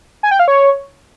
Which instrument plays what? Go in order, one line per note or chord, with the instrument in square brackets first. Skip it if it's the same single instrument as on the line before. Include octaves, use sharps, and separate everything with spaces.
[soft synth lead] G#5
G5
F5
C#5